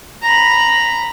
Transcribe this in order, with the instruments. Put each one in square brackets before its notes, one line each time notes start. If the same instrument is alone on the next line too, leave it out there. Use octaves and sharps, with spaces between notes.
[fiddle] A#5 B5